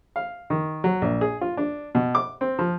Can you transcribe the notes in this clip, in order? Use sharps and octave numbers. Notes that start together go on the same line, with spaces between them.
F5
D#3
F#3
A#1
G#4
F4
D4
B2
D6
C4
F3